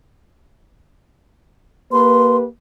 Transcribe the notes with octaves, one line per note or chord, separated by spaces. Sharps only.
A#3 G4 B4 C6